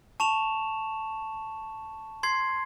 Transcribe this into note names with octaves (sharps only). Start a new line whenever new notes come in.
A5 C#6 E7 F7
C6 G#6 C7